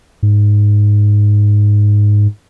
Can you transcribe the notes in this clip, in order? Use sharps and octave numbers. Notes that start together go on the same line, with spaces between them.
G#2